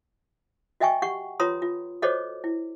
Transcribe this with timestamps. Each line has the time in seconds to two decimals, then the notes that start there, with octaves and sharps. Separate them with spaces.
0.80 F#4 D#5 E5 G5 G#5 C#6
1.02 G4 F#5 C#6
1.40 F4 B4 C#5 A#5 C6 D#6
1.62 F4
2.02 F#4 A4 C5 C#5 D#5 D6
2.44 E4